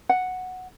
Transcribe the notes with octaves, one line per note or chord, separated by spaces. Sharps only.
F#5